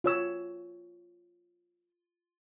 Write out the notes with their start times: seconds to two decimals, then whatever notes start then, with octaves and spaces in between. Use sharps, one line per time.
0.04 F4 C#5 E6